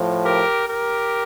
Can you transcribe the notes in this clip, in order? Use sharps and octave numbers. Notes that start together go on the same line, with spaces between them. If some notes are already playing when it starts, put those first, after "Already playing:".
Already playing: A2 F3
G4 A#4
G4 A#4